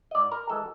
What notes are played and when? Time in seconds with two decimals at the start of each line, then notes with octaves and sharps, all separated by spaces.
0.11 D#5
0.15 G#2 D5
0.32 A#4
0.50 E3 G#3 A4